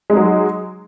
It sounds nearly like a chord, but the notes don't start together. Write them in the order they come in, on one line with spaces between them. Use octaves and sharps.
G#3 D#4 F#3